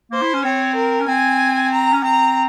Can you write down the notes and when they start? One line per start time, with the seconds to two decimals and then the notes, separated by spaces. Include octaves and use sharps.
0.11 A#3 C5
0.23 E4
0.34 C#4
0.44 C4 C#5
0.76 A#4
1.01 C#4
1.07 C4 G#5
1.71 A#5
1.93 C#4
2.03 C4 A#5